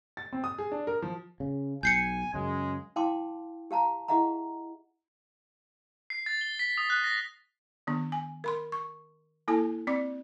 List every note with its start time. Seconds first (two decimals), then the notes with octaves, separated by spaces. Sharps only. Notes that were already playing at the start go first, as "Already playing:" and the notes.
0.17 A6
0.33 C4
0.44 D#6
0.58 G#4
0.72 D4
0.87 A#4
1.02 F3
1.40 C#3
1.83 B1 G#5 G6 C7 C#7
2.34 F#2 C#3 G#3
2.96 E4 F5 G5 A5 C6 D6
3.71 G4 F5 A5 A#5
4.08 E4 G#4 D#5 E5 F#5 A#5
6.10 C7
6.26 A6
6.41 G7
6.59 B6
6.78 D#6
6.90 F#6
7.04 A#6
7.87 D#3 B3 D4
8.12 G#5
8.44 A#4 B5 C6
8.72 C#6
9.48 A#3 E4 A4 G#5 A5
9.87 C4 D5 D6